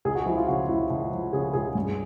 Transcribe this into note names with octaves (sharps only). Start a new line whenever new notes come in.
C#2 G#4
F#4
F3 E4
F4
C#3 F#4
C#2 E4
C#2
F3
C#3 G#4
C#2 G#4
G2